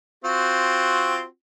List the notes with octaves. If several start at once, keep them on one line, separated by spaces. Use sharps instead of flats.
C4 F4 F#4